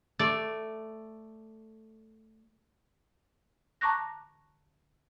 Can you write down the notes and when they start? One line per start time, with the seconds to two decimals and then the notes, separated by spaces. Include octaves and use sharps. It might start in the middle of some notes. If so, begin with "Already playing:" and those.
0.19 A3 D5
3.81 A5 A#5 C#6 D6 F#6 A#6